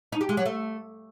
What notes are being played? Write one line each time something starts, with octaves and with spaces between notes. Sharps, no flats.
D#4
G4
G#3
F#3
A3